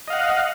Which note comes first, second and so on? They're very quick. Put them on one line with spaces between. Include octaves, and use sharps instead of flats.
D#5 F5 F#5